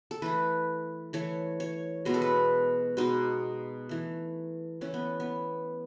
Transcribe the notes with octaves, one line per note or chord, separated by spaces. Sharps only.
A4
E3 A3 B4
E3 A3 C#5
C#5
B2 G#3 B3 B4
A4
B4
B2 G#3 B3 D#4
E3 A3
E3 A3 C#4
B3
B3